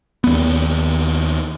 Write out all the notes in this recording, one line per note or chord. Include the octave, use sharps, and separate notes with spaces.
D#2 B3